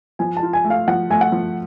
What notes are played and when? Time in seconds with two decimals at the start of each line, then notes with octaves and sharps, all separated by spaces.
0.19 F3 G#5
0.37 A5
0.43 F4
0.53 G#5
0.65 A3
0.70 F5
0.88 F3 F#5
1.10 A3 G#5
1.21 F#5
1.32 F3